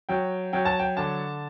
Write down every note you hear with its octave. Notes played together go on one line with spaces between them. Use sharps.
F#3 G5
F#3 G5
A5
G5
D3 A5